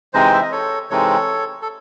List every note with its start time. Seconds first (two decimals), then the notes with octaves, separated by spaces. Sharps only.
0.14 C3 E3 G#3 C4 D#4 C5 D#5
0.34 E5
0.42 D#5
0.52 A4 C#5
0.90 C3 E3 G#3 C4 D#4 A4 C#5
1.62 A4